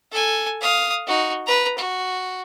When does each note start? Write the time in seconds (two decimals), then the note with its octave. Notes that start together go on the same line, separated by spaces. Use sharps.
0.12 A4 G#5
0.61 F5 D#6
1.07 D#4 F#4
1.46 B4 A#5
1.78 F#4